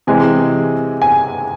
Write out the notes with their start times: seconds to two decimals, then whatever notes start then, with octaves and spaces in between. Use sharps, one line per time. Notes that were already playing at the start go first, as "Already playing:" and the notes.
0.07 C3 E3 G#3 G#5
1.02 G#5